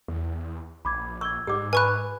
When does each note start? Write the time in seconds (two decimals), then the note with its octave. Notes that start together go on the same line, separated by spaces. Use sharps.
0.08 E2
0.85 A#1 B5 D6 G#6
1.21 C#6 E6 G#6
1.47 G#2 G4 D6
1.73 B4 G#5 B5 C#6 F#6